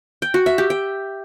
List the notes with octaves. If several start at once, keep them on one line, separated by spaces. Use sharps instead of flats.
G5
F#4
E5
G4
G5